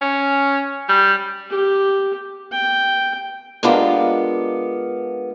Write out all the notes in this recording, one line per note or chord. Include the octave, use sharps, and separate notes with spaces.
C#4
G3
G4
G5
G#3 B3 D4 F4 G4 A#4